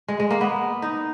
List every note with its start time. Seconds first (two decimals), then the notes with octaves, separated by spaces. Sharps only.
0.08 G#3
0.20 G#3
0.30 A#3
0.41 B3
0.82 D#4